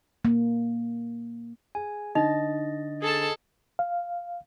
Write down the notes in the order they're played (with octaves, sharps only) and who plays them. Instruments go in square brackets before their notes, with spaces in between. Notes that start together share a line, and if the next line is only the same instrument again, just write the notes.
[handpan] A#3
[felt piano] G#4 [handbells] G#5
[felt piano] D3 [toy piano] D#4 [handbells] D#5 A6
[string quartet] G#4 A4 A5
[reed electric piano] F5